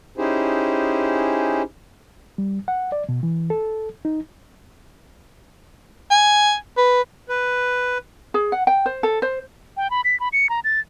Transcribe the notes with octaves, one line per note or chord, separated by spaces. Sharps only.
C#4 D#4 E4 G4 G#4 C5
G3
F#5
D5
B2
E3
A4
D#4
G#5
B4
B4
G#4
F#5
G5
C5
A4
C5
G5
B5
B6
B5
C#7
A#5
A6